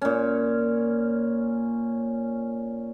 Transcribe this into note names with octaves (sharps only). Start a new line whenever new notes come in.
A#2 C#4